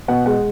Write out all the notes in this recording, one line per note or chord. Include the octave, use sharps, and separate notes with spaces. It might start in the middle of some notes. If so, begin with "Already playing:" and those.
B2 F#5
G#3 F#5